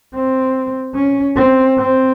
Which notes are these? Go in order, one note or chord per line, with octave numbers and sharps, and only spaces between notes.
C4
C#4
C4
C4